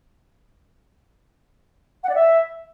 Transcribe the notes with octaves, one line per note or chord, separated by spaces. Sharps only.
F#5
D5
E5